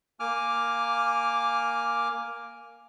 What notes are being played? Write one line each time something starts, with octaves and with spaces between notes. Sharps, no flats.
A#3 G#5 D6 F6